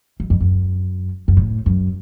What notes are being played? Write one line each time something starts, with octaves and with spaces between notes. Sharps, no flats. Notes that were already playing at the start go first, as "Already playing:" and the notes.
F#2
F2
F#2
F#2
A2
F#2